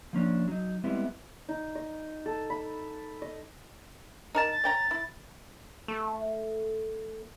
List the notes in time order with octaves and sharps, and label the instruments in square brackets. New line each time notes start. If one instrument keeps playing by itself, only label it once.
[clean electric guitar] F3 A#3 C#4 D4
F#3 D#4
G3 G#3 B3 C4 E4
[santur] D#4
D#5
A4
B5
D#5
[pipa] D#4 A#4 A5
[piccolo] A6
[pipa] C#4 G5 A#5
E4
[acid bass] A3